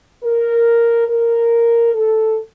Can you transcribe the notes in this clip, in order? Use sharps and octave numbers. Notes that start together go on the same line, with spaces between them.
A#4
A#4
A4